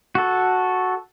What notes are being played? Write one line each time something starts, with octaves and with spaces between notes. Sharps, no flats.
F#4 A4